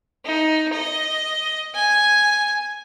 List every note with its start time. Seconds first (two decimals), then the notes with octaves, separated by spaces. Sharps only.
0.25 D#4
0.73 D#5
1.75 G#5